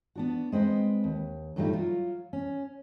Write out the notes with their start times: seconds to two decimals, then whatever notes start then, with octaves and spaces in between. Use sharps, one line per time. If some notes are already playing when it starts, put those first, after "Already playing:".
0.15 B3 D4 F#4
0.52 G#3 C4 B4 D#5
1.04 D#2
1.56 G2 A#2 F#3 G3 A3 D#4
1.73 F#3 F4 F#4
2.33 C#4